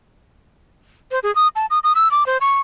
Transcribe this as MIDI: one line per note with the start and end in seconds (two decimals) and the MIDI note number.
1.11 1.19 72
1.23 1.34 68
1.35 1.48 87
1.56 1.66 81
1.70 1.79 87
1.84 1.93 87
1.95 2.11 88
2.11 2.26 86
2.26 2.38 72
2.41 2.60 85